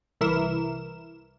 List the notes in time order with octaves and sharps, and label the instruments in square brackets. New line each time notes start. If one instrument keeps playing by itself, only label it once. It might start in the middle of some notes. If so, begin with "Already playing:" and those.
[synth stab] C2 E3 E4 A#4 E7